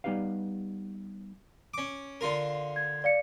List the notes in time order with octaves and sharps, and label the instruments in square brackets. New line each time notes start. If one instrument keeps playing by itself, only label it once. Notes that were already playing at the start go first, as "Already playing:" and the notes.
[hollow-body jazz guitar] G3 B3 D#4 G4 B4 F5
[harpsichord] C#4 D6
D3 F4 A#4
[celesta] G#6
D5 F5 C#7